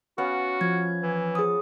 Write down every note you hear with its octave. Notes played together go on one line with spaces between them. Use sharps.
B3 C#4 F#4 F5
F3 G#6
E3
G#4 D#6